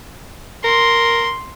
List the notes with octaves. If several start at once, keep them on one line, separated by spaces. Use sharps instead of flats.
A#4 C6